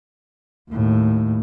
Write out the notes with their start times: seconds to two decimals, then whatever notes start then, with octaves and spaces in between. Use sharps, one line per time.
0.71 D#2 A2